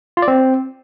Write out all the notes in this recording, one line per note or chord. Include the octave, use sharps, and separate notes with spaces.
F4
D5
C4